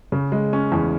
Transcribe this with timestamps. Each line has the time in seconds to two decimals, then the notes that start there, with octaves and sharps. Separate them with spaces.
0.12 C#3
0.32 G#3
0.53 C#4
0.72 E2